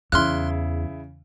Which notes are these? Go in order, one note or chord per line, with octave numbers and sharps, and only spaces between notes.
E2 C#3 E4 C6 F6 F#6